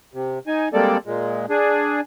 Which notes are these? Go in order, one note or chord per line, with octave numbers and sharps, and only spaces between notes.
C3
D#4 G#5
G3 G#3 A#3 C4 A4 D5
A#2 G#3
D4 G#4